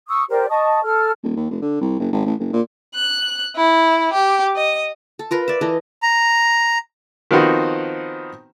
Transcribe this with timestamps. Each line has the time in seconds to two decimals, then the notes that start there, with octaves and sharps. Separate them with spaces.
0.09 C#6 D#6 E6
0.30 G4 A#4 C5 D5
0.49 D#5 A5 C#6 D#6
0.83 A4 F6
1.23 D#1
1.36 D#2
1.50 F1
1.62 D3
1.81 C2
2.00 F#1
2.12 G#1
2.26 A1
2.39 F#1
2.53 A#2
2.95 F#6
3.56 E4
4.13 G4
4.56 D#5
5.19 A4
5.31 F4 A#4 B4
5.48 D5 E5
5.61 E3 A4 D#5
6.03 A#5
7.31 D#3 F3 B3 C4 D#4 F#4